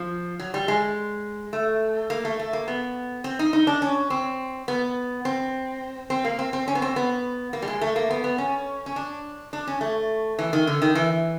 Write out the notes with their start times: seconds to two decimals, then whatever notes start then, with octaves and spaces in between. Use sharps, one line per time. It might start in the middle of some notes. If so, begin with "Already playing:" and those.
Already playing: F3
0.39 F#3
0.54 G3
0.68 G#3
1.53 A3
2.10 A#3
2.25 A3
2.39 A3
2.53 A#3
2.68 B3
3.24 C4
3.39 D#4
3.53 D#4
3.67 D4
3.82 C#4
4.10 C4
4.68 B3
5.25 C4
6.10 C4
6.24 A#3
6.39 C4
6.53 C4
6.68 C#4
6.75 B3
6.82 C4
6.96 B3
7.53 A#3
7.62 G3
7.68 G#3
7.81 A3
7.96 A#3
8.11 B3
8.24 B3
8.38 C#4
8.86 C#4
8.96 D4
9.53 D4
9.67 C#4
9.81 A3
10.39 E3
10.53 D#3
10.67 D3
10.82 D#3
10.95 E3